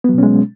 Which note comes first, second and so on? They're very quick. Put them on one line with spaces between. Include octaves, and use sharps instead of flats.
B3 F#3 B2 C#4 G#3